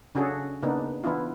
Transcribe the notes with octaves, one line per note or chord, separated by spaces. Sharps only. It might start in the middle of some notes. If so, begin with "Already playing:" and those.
C#3 C#4 D4 F#4 G#4 A4
C#3 A#3 B3 D4 D#4
E3 B3 D4 E4 F4